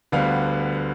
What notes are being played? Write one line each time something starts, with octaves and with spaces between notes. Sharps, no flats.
D2 D3 G3 B3 F5